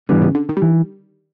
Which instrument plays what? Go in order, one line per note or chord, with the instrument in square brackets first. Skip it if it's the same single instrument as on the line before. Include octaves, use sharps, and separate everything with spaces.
[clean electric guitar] G#2 E3 G3 B3 [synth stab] D3
[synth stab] C#3
D3
D#3
G3
[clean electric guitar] E3